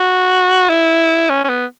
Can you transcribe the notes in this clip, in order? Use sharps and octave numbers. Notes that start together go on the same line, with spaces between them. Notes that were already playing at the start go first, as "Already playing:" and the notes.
Already playing: F#4
E4
C#4
C#4
B3